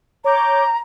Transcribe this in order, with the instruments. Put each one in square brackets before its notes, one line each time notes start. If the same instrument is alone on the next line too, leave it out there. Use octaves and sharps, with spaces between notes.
[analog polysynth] C#5 D6 G6 [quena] A#5